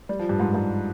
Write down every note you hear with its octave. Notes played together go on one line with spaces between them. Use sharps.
G3
F3
G2
G#2
G#2